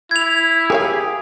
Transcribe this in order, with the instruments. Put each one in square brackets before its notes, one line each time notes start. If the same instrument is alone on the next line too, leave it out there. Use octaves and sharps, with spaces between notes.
[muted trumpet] E4 [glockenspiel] G#6 F7
[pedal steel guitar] G4 G#4 [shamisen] A#4 C#5 F5